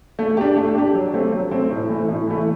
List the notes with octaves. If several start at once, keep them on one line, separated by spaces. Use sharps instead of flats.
A3
D4 G4
A3
D4 G4
F#3
A3 C4
F#3
A3 C4
A2
E3 A3
A2
E3 A3